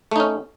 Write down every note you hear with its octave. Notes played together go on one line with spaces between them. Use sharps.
A3 C#4 D#4